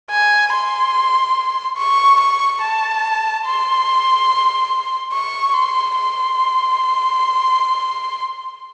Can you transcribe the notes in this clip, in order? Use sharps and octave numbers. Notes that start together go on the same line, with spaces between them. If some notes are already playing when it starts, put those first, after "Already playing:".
G#5
C6
C#6
C#6
A5
C6
C#6
C6
C6